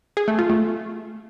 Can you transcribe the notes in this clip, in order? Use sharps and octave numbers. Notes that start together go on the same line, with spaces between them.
G#4
A3
F4
A3